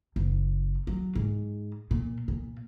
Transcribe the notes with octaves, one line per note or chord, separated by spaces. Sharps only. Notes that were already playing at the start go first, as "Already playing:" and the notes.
F#1
F#3
G#2
A#2
A#2